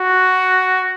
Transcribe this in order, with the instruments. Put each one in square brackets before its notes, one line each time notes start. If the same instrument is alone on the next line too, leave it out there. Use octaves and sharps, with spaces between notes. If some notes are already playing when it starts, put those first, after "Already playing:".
Already playing: [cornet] F#4